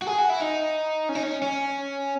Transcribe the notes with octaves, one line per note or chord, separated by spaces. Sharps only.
F#4
G#4
F#4
E4
D#4
C#4
D#4
C#4
C#4